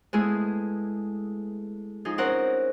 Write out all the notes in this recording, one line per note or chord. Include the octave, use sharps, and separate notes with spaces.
G#3 A3 B3 E4 G#4
F3 D#4 G#4
C4 C#4 A#4 C5 F#5